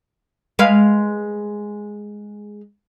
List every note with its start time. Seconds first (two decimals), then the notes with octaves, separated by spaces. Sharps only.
0.59 G#3 B4 F5